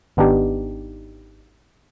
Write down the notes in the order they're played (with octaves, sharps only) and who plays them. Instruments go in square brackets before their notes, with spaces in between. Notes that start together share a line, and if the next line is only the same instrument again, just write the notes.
[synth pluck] G#1 B3 D4 D#4 G4